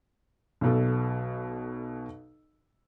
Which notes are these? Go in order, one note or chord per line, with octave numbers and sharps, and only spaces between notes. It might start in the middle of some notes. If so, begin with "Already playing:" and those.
B1 B2 A4